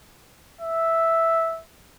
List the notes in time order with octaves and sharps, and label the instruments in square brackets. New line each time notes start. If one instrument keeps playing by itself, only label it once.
[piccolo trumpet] E5